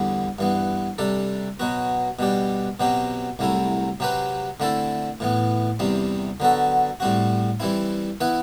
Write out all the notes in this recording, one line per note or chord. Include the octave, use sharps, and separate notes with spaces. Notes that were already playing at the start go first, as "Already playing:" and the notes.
Already playing: E2 D3 G3
G2 E3 B3
C3 G3 D4 A4
B2 F#3 B3 F#4
B2 G3 D4 G4
B2 F#3 C4 G4
C2 C3 F#3 A3 E4
C3 F#3 C4 G4 B4
D3 A3 C4 E4 A4
A2 E3 B3
E2 C3 G3 C4
D3 F#3 B3 F#4 A4
A2 G3 C4 F#4
E3 G3 C4 E4
E3 B3 E4 B4